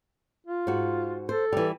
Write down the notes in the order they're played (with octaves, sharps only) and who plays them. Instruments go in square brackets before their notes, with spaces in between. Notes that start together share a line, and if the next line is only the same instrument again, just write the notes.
[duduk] F4
[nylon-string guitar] G#2 F#4
[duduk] A4 [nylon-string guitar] C5
[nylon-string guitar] E3 G3